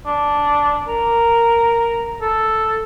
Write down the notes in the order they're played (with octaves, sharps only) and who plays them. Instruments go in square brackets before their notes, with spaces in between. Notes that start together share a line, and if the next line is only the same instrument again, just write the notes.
[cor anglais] D4
A#4
A4